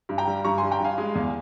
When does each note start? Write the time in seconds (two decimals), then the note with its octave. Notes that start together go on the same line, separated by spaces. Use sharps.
0.09 G2
0.18 G5 A#5
0.27 G3
0.44 G2 A#5 C#6
0.58 G3 G#5 C6
0.71 G5 A#5
0.80 G2 F5 G#5
0.98 G#3
1.15 E2